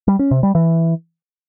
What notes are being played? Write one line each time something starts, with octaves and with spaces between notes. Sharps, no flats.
G3
C#4
C3
G3
E3